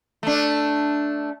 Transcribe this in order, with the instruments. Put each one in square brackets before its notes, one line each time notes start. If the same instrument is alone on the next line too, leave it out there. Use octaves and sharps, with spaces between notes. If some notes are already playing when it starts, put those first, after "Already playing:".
[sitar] A3 D4